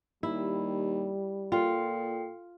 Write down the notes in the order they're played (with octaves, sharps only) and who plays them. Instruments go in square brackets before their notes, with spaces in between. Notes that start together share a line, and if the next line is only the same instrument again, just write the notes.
[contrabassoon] D#2 [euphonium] G3 [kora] E4
[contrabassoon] A#2 [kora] F4 [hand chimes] A4 G5 C7